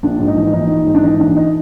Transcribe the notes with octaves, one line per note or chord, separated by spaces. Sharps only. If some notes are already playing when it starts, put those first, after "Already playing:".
A#1 D4
G#2
D#4
E3
A#1 D#4
A#1
G#2
D4
E3 D#4
A#1 D4
D#4